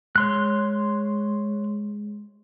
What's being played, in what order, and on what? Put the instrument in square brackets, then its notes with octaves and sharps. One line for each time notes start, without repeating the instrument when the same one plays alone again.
[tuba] G#3 [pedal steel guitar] C#5 C6 F#6